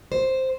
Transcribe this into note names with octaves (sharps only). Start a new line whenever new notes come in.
C5